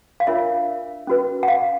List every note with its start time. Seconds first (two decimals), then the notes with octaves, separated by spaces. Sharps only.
0.20 F5
0.27 D4 F4 A#4 C#5 E5
1.07 C#4 F#4 B4
1.43 F#5
1.48 F5